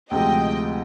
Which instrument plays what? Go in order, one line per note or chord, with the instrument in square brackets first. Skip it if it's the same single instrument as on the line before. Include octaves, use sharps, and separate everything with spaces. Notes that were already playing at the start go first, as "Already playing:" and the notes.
[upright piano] D2 C3 F3 G#3 [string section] D#5 G5